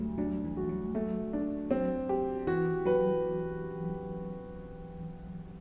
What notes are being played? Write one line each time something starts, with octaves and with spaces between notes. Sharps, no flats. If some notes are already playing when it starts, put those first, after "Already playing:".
Already playing: D2 F#3 G3 A3
F#3 D4
E3
F#4
F#3
F#3 A3
D4
F#3 C4
G4
E3 F#4
F#3 B4